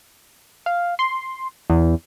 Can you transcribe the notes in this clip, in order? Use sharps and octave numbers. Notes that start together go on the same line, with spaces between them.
F5
C6
E2